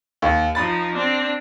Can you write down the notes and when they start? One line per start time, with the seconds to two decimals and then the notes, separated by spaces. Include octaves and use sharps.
0.22 D#2
0.55 F3 D#4 B5 A6
0.95 C4 D4